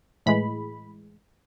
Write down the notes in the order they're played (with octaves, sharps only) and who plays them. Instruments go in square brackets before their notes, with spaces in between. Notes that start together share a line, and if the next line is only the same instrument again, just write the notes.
[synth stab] A2 E3 G#3 B5